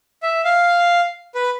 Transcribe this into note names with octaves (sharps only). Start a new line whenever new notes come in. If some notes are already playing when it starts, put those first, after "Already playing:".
E5
F5
B4